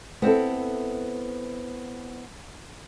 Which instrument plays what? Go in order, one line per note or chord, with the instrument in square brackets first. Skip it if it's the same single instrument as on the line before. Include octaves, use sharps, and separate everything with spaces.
[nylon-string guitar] B3 C4 E4 A4